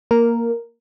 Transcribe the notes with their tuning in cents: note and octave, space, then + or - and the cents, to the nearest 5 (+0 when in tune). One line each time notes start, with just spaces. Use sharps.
A#3 +0 A#4 +0